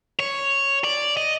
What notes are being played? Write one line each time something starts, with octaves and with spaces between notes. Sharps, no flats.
C#5
D5
D#5